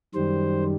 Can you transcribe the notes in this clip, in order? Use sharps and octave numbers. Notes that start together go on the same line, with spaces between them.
F#2 D#3 G3 C5